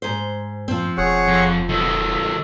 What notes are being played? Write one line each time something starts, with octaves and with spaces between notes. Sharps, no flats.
G#2 C5
F#2 F3 C4
E1 G#4 C#5 F#5
F2
D#3 F#3 A4